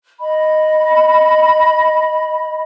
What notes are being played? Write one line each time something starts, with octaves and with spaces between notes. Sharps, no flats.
D#5 B5